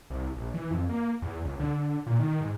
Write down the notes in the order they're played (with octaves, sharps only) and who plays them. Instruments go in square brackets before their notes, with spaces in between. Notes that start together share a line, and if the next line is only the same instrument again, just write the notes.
[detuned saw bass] C2
A#1
E3
F2
A#3
E2
C#2
D3
A#2
D#3
G#2